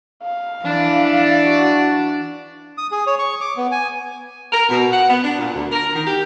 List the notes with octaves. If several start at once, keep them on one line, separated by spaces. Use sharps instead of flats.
F5
E3 D4 D5
F#4
D#6
G#4
C#5
C#6
D6
B3
G#5
A#4
B2
F#5
B3
D4
A#2
D2
A#4
D#3
G4